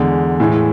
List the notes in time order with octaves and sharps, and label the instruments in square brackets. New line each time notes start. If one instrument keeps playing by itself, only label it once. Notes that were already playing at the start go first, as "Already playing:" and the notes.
Already playing: [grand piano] E2 D3 G#3
A2 E3 G#3